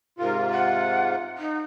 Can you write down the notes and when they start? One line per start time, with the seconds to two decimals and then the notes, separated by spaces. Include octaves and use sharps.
0.19 G#2 C3 F4 A#4
0.51 F#5
1.37 D#4